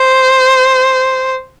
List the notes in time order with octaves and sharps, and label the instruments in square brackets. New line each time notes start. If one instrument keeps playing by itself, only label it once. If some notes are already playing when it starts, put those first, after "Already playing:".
Already playing: [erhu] C5